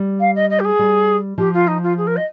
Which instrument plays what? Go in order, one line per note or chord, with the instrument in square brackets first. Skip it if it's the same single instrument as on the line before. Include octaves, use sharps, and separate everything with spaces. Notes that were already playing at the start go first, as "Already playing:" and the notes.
Already playing: [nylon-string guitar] G3
[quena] F5
D#5
D#5
G4
G#4
[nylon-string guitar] G3
[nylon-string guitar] F3 [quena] G4
[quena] F4
D#4
F4
G#4
A#4
D#5